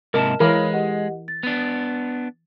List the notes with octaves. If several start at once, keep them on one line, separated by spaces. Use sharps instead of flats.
G#2 C3 E4 A#4 D#5 A5 E7
E3 G#3 A#4 C#5 F5 B5
G4 D#5 F#5
A6
B3 D4